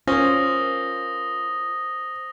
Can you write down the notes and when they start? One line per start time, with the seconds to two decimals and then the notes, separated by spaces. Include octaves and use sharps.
0.07 C#4 F4 A#4 C5 D#6 A#6 G7